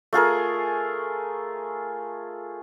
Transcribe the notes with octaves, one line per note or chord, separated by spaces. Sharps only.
A3 F4 G#4 A#4